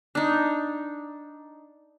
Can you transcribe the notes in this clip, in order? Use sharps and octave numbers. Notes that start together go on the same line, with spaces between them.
D4 D#4